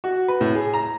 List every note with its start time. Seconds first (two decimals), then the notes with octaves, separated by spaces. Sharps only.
0.04 F#4
0.28 B4
0.41 A2
0.55 G#4
0.73 A#5